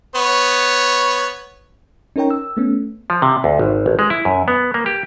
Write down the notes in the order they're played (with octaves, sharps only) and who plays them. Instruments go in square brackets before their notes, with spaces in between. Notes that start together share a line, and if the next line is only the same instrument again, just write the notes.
[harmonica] B3 C#5
[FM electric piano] C#4 D#4 A#4 C#5 G5 A#5
E6
A3 B3 C#4
[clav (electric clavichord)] F3
C3
D2
G#1
A1
G#3
E4
F#2
B3
A#3
G4